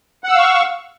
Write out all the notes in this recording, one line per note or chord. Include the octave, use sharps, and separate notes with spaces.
F5 F#5 C#6 E6